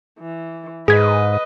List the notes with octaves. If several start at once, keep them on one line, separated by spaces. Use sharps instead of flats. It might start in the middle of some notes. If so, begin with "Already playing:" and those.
E3
G#2 G#4 B4 D#5 G#6 B6